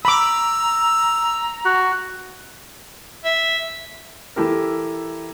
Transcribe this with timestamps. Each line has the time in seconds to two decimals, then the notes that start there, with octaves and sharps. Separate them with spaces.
0.05 A#5 B5 D6 E6
1.65 F#4
3.25 E5
4.36 E3 A3 E4 G4 A#4